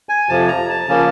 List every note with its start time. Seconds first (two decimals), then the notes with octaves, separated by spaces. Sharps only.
0.09 G#5
0.29 F2 C3 F3 A5
0.48 A#5
0.69 A5
0.88 C#3 F3 A#3 C#4